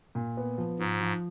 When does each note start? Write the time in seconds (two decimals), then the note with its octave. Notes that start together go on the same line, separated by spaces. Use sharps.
0.15 A#2
0.37 B3
0.58 F3
0.79 G#2 F3
1.01 F3